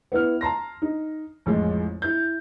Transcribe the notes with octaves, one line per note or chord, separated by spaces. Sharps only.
B3 E4 F6
A5 A#5 C6 A#6
D#4
A1 F2 G#3
E4 G6